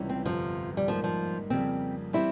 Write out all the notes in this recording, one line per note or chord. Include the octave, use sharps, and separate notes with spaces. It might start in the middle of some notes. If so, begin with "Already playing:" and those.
Already playing: C#2 C3 E3 G3 C#4
C4
G1 F2 C3 F3
G3
G#2 F3 G3 A#3
F3
F2 C#3 G3 A#3 C4
E3 G3 C4 E4 G4